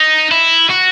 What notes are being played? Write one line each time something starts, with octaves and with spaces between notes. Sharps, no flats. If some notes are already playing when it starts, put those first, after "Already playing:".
Already playing: D#4
E4
F#4